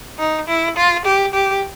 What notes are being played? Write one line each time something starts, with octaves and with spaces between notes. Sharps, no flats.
D#4
E4
F4
G4
G4